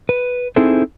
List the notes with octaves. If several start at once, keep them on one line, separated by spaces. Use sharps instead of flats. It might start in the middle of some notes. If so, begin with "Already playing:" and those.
B4
C4 D#4 E4 G#4 A4 C5